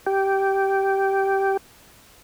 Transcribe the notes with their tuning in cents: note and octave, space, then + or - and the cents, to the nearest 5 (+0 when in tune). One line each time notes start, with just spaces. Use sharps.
G4 -10